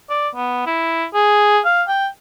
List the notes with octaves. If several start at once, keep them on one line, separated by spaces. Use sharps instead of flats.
D5
B3
E4
G#4
F5
G5